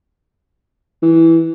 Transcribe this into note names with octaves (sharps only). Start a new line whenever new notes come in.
E3